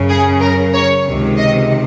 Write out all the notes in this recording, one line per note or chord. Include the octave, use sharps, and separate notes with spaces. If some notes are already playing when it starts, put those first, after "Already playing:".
Already playing: F#2 C#3
G#4
A#4
C#5
C#2 C3 D#3
D#5